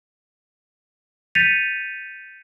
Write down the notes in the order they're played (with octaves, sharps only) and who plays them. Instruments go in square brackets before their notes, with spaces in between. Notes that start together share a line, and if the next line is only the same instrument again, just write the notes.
[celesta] G6 A6 B6 C#7 D#7 F7